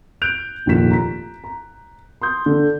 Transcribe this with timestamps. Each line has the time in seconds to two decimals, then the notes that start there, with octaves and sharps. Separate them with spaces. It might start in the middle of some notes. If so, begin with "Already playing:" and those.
0.22 F#6 G6 D7 F7
0.66 F1 A#1 D#2 F4 B6 E7
0.91 A#5 B6
1.44 A#5
2.22 C6 D#6 G6
2.46 D3